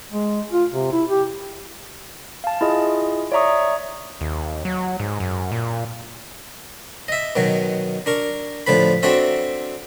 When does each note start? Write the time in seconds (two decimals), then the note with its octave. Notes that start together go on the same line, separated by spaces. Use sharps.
0.12 G#3
0.52 F4
0.72 C3
0.92 E4
1.09 G4
2.44 F5 A5
2.61 E4 F4 G#4 D#5
3.32 C#5 D5 E5 A#5 C#6 D#6
4.21 D#2
4.65 F#3
5.00 G#2
5.20 F#2
5.52 A#2
7.08 D#5 E5
7.36 B2 D#3 F#3
8.06 D4 A#4 C#6
8.67 A2 D3 F3 B4 B5
9.03 C4 D4 F#4 A4 C#5 E5